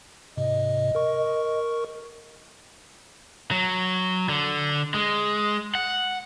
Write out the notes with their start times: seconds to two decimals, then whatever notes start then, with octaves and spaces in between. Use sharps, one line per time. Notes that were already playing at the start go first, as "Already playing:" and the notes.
0.37 G#2 C3 D#5
0.95 A#4 C#6
3.51 F#3
4.29 D3
4.94 G#3
5.75 F#5